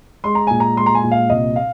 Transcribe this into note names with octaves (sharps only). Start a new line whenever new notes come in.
G#3 C6
A#5
A#2 G#5
A#5
G#3 C6
A#5
G#5
A#2
F5
C2 D#5
F5